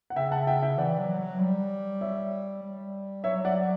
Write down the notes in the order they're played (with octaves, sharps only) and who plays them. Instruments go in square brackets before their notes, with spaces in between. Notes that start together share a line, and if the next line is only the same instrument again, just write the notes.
[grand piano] F#5
[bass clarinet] C#3 [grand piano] E5 G5
[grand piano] F#5 A5
E5 G5
E5 G5
[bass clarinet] E3 [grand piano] D5 F#5
[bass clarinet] F#3
F#3
G3
[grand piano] C#5 E5
[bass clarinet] G3
[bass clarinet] F#3 [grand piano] C#5 E5
[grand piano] D5 F#5